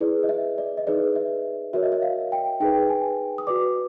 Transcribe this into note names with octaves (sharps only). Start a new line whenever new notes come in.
E4 G#4 B4 D5
D#5
E5
D5
D#5
D#4 G#4 B4 D5
E5
F#4 A#4 C#5 E5
D#5
E5
F5
G5
D#4 G#4 B4 G5
G#5
D#6
F#4 B4 D5 D6